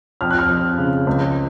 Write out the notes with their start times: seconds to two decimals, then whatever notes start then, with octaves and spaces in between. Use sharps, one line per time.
0.21 F2 F6
0.31 F#6
0.39 F6
0.49 F2
0.78 C#3
1.07 C#2